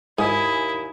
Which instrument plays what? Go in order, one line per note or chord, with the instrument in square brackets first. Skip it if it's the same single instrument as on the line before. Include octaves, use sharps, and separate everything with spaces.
[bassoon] D#2 [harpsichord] G#2 [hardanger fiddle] E4 [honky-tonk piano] G#5 D#6 G#6